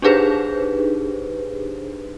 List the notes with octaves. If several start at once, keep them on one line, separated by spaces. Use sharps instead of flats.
D4 D#4 G4 G#4 B4 C5